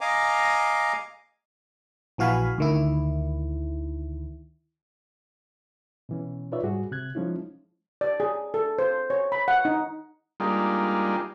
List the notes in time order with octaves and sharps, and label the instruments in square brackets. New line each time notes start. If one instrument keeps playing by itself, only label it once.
[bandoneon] D#5 F5 G#5 A#5 D6
[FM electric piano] A#1 E3 F#4 F5 G#5 B5
D2 D#3 E4
[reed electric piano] B2 E3 C#4
D#4 F4 B4 C#5 D5 E5
G#2 G3 F#4 G#4
C3 F#6 G#6
F3 G#3 C#4 D#4 E4
[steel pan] D5
G#4
A4
C5
C#5
B5
F#5
D#4
[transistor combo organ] G3 G#3 A#3 D4 D#4 F4